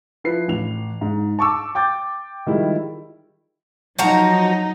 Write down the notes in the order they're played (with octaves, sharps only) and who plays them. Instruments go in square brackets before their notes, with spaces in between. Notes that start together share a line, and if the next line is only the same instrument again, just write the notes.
[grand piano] F3 E4 B4 C7
A1 F7
G#2
A5 C#6 D6 E6
G5 D6 G6 A6
D#3 F3 G3 G#3 E4
[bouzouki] F3 F#4 A#5 [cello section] F#3 D#4